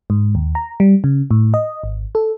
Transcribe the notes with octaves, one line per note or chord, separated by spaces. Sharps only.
G#2
D#2
A#5
G3
C#3
A2
D#5
G#1
A4